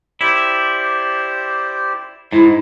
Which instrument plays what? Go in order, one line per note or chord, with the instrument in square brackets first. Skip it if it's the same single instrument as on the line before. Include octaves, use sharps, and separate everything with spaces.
[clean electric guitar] E4 [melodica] G4 C5 D5
[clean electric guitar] G#2 [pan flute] E4